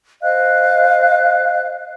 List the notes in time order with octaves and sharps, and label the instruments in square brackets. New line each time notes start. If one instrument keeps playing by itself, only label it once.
[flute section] C5 D#5 F5 F#6